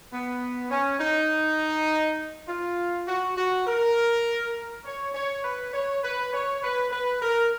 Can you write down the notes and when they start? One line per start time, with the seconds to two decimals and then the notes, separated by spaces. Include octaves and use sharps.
0.12 B3
0.71 C#4
1.00 D#4
2.48 F4
3.07 F#4
3.37 F#4
3.67 A#4
4.85 C#5
5.14 C#5
5.44 B4
5.73 C#5
6.03 B4
6.33 C#5
6.63 B4
6.92 B4
7.22 A#4